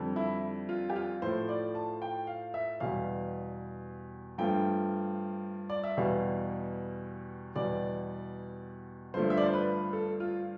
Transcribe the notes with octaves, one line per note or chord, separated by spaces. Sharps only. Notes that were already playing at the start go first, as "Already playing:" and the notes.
Already playing: F2 D3 G3
E4
F4
G4
F4
A2 F3 A3 C5
D5
A5
G5
F5
E5
E2 B2 G3 F5
G2 F3 A3 G5
D5
E5
E2 B2 G3 F5
E2 B2 G3 D5
G2 D3 F3 A3 C5
E5
D5
C5
B4
A4
F4